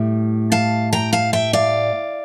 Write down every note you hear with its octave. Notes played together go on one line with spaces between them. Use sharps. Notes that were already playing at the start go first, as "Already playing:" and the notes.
Already playing: A2 G3
F5 A5
G5 A#5
F5 A5
E5 G5
D5 F5